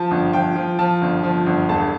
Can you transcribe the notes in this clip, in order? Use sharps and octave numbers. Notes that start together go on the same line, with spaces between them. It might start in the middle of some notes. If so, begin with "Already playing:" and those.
Already playing: F3 A5
G1
F3 G5
F3
F3 A5
G1
F3
G1
E1 A5